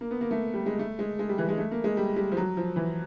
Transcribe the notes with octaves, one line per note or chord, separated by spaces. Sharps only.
A#3
B3
A#3
A3
G3
G#3
A3
G#3
G#3
G3
E3
G#3
A3
A#3
G#3
G3
G3
F3
F#3
F3
E3